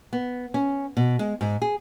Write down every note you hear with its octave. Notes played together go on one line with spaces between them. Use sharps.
B3
C#4
B2
G#3
G#2
G#4